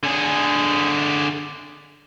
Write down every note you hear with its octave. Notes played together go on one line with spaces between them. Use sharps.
D3 G#4